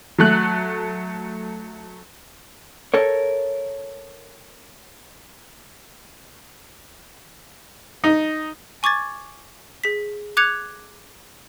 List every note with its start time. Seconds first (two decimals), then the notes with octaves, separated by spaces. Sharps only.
0.18 F#3 A3 F#6
2.94 A4 A#4 C#5
8.04 D#4
8.83 G#5 C#6 D6 G#6 A6
9.84 G#4 B6
10.37 D6 F#6 G#6 C#7 F7